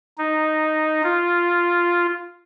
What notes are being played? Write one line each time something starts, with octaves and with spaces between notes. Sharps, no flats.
D#4
F4